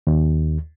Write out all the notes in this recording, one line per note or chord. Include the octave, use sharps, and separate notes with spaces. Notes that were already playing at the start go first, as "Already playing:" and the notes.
D#2